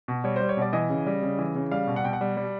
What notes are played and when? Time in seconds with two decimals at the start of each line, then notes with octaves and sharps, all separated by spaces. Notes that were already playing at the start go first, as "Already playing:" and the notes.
0.08 B2
0.24 G3 C#5
0.36 G3 C5
0.49 C#5
0.57 B2 D5
0.73 E3 D#5
0.90 C#3
1.06 G3
1.23 C#3
1.39 E3
1.55 C#3
1.71 G3 F5
1.87 B2
1.96 F#5
2.04 B2 G5
2.13 F#5
2.21 G3
2.37 G3